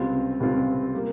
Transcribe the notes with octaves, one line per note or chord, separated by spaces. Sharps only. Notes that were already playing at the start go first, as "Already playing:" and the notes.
Already playing: C#2 C3 G3 C4 F4
C#2 C3 G3 C4 F4
G3 A#3